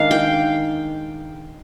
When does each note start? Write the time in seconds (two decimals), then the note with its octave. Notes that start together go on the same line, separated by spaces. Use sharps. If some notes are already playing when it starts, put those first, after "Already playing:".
Already playing: D#3 G#3 D4 F5
0.11 G5